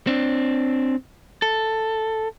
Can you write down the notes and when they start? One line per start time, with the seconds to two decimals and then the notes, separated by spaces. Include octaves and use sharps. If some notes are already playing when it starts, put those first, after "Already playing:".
0.07 C4 D4
1.42 A4